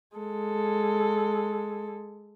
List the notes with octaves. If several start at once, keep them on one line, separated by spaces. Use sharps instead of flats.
G#3 A4